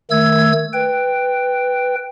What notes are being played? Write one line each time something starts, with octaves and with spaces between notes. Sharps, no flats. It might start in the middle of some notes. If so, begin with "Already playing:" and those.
D#3 A3 E6 G#6
B4 G5